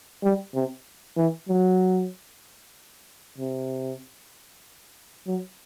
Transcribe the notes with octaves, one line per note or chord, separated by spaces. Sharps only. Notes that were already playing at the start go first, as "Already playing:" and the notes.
G3
C3
E3
F#3
C3
F#3